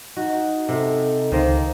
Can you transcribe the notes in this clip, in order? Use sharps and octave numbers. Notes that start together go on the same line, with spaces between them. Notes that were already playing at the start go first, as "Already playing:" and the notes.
D#4 F#4
C3 A4
C#2 D#3 A#3 C5